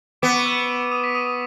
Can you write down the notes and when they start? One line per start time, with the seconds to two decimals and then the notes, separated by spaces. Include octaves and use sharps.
0.22 B3 D6 D7
0.34 C#6 C#7
0.46 E6 E7
0.91 D#6 D#7
1.04 B6
1.15 D#6 D#7
1.25 D#6 D#7